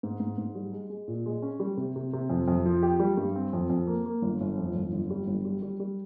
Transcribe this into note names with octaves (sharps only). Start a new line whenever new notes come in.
G#2
G#2
G#2
G3
G#3
G#3
A#2
G#3
C#4
G3
C3
C3
C3
F2
F2
F3
G4
G3
G2
C4
F2
F2
A#3
A#3
G1
G1
F2
G1
G1
G3
G1
G3
G3
G3